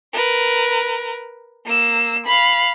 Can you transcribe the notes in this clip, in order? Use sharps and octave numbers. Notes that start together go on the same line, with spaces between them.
A#4 B4
A#3 E6
F5 B5